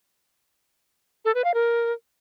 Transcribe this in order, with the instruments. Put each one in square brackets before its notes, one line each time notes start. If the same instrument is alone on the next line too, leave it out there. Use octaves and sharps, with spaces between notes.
[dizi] A4
B4
F5
A#4